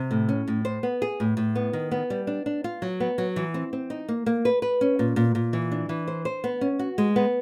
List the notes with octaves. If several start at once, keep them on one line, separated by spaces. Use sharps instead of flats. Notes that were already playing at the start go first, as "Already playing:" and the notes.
Already playing: C3
A2
C#4
A2
C5
B3
G#4
A2
A2
B3
D#3
B3
G3
D4
D4
F4
F#3
B3
F#3
E3
C4
C4
D#4
A#3
A#3
B4
B4
C#4
A#2
A#2
A#2
E3
D4
E3
C5
C5
B3
C#4
F#4
G#3
B3